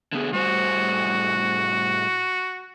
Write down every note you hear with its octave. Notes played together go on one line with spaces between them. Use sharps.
D3 B3 G#4
A2 G3 F#4 C5